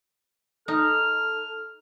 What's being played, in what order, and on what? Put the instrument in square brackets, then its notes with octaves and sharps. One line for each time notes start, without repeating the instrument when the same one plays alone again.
[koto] D#4 [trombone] A4 [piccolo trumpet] F6